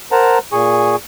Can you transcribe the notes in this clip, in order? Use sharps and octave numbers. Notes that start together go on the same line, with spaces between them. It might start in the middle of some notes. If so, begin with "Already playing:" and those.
A#4 C5 F#5 A5 A#5
A#2 G#4 G#5 C#6